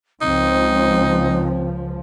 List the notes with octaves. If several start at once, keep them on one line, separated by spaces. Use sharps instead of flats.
C#2 F3 C4 D#4